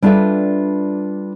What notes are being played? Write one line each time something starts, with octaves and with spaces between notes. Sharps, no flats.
G3 D4 F4 A4 B4 E5